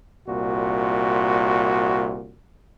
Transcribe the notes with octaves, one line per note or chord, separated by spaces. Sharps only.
C2 A#2 F#4